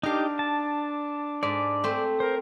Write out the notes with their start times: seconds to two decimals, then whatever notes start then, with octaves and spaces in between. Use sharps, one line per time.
0.03 D4 D#4 G4 A#4 F5
0.39 A5
1.43 G#2 D5
1.84 A3 C4
2.20 A#4 C5